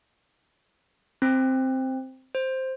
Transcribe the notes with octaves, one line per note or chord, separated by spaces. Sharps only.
C4
C5